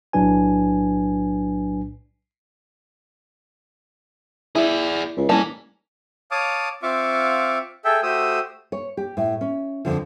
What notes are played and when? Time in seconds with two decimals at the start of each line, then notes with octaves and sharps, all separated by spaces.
0.13 B1 A2 F#3 D4 B4 G#5
4.55 E4 G#4 D5
5.17 C#2
5.29 A1 G3 A#3 D#4 G#5 A5
6.31 C#5 F5 A5 D6 D#6
6.83 C4 F4 E5 F5 C#6 D6
7.85 G#4 A4 E5 G5
8.03 A3 F#4 G4 C5 D#6 E6
8.72 C#5
8.97 G4
9.17 A2
9.41 C#4
9.85 F2 D3 F3